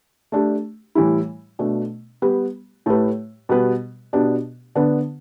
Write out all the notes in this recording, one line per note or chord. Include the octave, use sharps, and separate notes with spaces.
A3 D4 G4
A2 E3 G3 E4
B2 A3 D4
G3 B3 G4 B4
A2 A3 G4 B4
B2 G3 B3 G4 B4
B2 B3 D4 G4
D3 B3 D4 B4